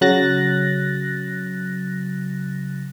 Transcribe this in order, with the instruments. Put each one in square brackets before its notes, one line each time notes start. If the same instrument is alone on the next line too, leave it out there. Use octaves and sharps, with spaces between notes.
[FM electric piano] C#3 F#3 F#6 A6 A#6